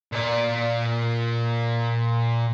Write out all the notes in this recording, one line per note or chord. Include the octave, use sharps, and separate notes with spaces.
A#2 D5